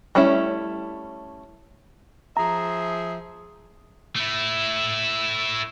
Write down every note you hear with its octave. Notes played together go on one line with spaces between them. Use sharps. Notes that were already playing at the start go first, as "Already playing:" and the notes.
G3 A3 C#4 E4
F3 G#4 E5 A#5
A3 E4